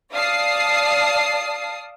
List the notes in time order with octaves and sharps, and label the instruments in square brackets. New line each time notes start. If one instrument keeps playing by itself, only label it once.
[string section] D5 F5 A5 D#6 C7